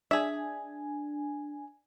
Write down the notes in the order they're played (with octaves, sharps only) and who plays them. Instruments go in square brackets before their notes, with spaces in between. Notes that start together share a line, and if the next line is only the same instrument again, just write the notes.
[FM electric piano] D4 G#5 [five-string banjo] G#4 E5